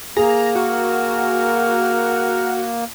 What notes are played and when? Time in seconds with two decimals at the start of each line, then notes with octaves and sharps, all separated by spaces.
0.17 A#3 G#4 A#5
0.55 F#4 A#4